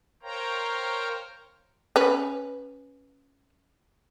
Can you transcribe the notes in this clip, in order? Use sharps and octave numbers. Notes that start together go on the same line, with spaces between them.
A#4 C5 C#5 F5 G5 A#5
C#4 B4